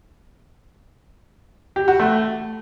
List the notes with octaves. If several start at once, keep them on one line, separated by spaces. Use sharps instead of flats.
G4
F#4
A3